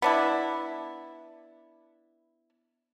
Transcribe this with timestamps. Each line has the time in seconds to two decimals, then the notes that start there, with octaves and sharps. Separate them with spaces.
0.02 B3 D4 E4